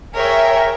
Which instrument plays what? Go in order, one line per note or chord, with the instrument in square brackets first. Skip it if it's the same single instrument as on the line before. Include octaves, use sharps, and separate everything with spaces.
[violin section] G#4 C#5 E5 G5 [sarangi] A#4